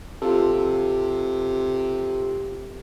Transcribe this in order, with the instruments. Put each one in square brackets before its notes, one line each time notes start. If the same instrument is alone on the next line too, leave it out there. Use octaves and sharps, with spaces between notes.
[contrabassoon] C3 [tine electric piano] F4 A4